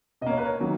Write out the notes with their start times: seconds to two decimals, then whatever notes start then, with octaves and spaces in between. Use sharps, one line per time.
0.21 B2 D#5
0.26 A#3 C#5
0.38 B4
0.45 A#4 C#5
0.60 D#3 F#3 A#3